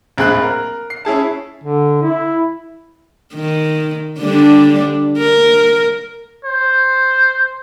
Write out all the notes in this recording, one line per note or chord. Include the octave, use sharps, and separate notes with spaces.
D1 A#1 C4 G#4 B5 F#6
A#4
C7
C#4 E4 G#4 A5
D3
E4
D#3
D3 G3 D4
A#4
C5